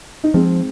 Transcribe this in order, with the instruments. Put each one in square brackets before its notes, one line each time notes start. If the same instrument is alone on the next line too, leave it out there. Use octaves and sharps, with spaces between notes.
[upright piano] D#4
[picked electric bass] F3 [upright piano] G#3 C4